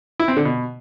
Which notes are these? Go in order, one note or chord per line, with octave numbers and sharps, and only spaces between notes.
E4
C4
D3
B2